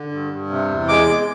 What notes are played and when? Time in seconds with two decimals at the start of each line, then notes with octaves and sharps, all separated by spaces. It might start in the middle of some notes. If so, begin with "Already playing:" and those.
Already playing: D3
0.12 G2
0.31 G2
0.50 C3
0.69 E2
0.88 G#3 D6
1.08 G#3